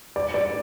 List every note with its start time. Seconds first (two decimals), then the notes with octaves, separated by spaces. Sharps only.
0.16 D5
0.34 D5